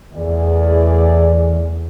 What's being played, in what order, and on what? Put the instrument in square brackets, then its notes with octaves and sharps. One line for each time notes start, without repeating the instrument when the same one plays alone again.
[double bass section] E2 [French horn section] A2 G#4 D5